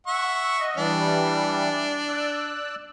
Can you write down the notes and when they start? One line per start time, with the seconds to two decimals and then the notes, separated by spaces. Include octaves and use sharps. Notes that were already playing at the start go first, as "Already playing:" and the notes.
0.07 E5 F#5 C#6
0.60 D#5
0.77 E3 G3 D4
2.09 D5 E6 F#6